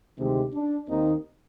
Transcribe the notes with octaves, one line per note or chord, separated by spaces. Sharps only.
D2 C3 D#3 G#3 C4 D#4 G4
D4
D#2 D#3 A#3 C4 D#4